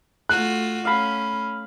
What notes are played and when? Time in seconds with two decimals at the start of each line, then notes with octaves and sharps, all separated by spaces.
0.29 A3 F4 F#4 F#6
0.85 A3 C#4 F5 B5